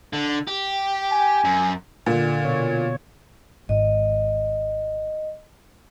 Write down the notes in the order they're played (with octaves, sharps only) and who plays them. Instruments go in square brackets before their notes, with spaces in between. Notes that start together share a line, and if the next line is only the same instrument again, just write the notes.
[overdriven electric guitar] D3
G4
[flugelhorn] G#5
[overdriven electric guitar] F#2
[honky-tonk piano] A#2 [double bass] D3
[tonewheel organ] B2 C#5
[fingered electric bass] G#1 G#2 [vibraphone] D#5